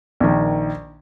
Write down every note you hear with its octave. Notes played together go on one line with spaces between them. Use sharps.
A#1 D#3